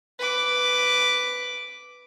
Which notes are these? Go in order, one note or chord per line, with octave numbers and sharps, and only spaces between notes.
B4 D6